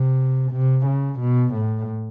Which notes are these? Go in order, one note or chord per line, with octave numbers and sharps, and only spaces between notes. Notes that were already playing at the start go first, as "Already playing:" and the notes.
Already playing: C3
C3
C#3
B2
A2